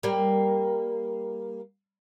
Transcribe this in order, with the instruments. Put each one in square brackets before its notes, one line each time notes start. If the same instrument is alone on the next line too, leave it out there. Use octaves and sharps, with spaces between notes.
[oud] G3 A#3